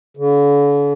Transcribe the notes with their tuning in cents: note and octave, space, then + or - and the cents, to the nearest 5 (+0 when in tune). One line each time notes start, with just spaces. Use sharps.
D3 -45